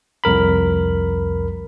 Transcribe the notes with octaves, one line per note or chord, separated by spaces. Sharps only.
C2 F2 A#4 B5